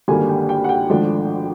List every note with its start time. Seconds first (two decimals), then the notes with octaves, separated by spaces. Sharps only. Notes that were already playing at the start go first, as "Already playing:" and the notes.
0.08 G#1 G2 D3 G3 A#3 G#5
0.29 G5
0.49 G5
0.64 F#5
0.69 G5
0.90 G#1 G#2 F3 A3 D4